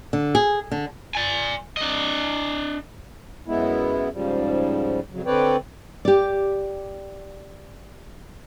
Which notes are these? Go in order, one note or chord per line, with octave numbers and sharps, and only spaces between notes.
D3
G#4
D3
D5 G#5
D4 D#5
F#2 G#3 B3 E4
G#2 C#3 F3 G3
F2 C#3 F#3
D3 C4 B4 C#5 D5 G5
G4 D5